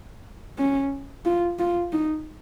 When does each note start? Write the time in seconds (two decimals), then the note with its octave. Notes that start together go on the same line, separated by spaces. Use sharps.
0.58 C#4
1.25 F4
1.59 F4
1.93 D#4